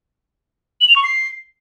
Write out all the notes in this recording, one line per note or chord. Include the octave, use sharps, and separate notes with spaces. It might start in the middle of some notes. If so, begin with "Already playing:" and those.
F#7
F7
C#6
C7